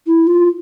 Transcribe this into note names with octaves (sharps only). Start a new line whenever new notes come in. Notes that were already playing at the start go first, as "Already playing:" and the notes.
E4
F4